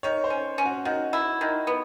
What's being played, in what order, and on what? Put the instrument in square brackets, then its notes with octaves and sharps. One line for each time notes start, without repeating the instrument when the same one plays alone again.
[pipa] D#3 [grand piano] C#5
[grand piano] C5
[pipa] C#4
C#4
[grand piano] F#4
[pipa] D#3 [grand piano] F#4
[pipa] E4
D#3
B3